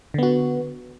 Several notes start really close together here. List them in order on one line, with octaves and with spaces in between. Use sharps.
D3 B3 F#4